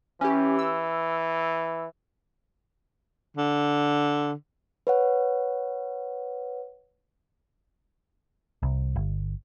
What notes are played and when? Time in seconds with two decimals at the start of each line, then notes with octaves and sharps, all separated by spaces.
0.21 E3 C#4 G4
0.59 E6
3.37 D3
4.87 B4 C#5 F#5
8.63 C2
8.96 G1